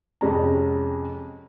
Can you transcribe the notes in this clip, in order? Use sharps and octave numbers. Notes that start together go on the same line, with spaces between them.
F2 C3 G#3 C#4 A#5